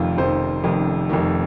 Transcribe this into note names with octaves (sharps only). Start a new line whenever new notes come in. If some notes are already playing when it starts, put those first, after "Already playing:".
Already playing: F1 F2 D#3 F4
F1 F2 D#3 C5
F1 F2 D#3
F1 F2 D#3